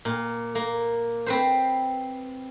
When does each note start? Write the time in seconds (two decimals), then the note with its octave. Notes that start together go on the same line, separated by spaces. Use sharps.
0.05 A#2
0.55 A#3
1.26 C4 B4 C5